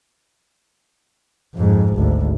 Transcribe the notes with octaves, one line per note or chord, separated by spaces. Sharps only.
F2 G#2
G#1 D2